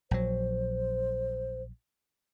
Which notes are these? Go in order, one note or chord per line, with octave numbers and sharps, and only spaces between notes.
A#1 F#3 C5